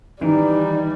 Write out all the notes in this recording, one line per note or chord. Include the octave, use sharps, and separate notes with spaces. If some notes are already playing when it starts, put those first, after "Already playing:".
D#3 E3 G3 D#4